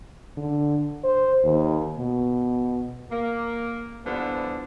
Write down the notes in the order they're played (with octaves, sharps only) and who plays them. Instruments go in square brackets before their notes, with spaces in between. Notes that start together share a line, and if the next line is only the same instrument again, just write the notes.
[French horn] D3
C5
D#2
B2
[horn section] A#3
D3 E3 F3 G3 B3